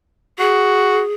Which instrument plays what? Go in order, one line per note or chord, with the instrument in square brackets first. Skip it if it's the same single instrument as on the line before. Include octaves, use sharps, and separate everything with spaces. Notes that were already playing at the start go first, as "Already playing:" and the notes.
[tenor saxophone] F#4 [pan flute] G#4